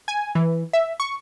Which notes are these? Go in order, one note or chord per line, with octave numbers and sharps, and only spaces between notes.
G#5
E3
E5
C#6